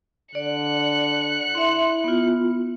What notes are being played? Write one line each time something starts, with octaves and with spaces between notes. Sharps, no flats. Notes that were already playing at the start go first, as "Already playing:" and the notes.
D3 D5 F#6 C#7
E4 E5 C6
B3 F4